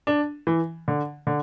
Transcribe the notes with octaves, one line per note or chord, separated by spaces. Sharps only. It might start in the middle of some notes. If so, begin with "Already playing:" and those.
D4
E3
D3
D3